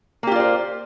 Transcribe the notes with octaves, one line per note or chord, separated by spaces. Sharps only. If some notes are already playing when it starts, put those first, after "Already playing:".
A#3 F4 G4 C5 D5